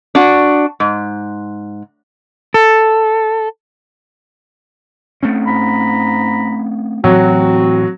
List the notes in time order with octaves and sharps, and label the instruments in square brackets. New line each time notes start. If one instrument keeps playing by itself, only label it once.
[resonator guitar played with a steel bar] D4 F#4
G#2
[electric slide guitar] A4
[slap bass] A3 C4 C#4
[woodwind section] G#2 A#5 B5
[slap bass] A2 E3 [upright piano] F#3 [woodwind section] C4 F#4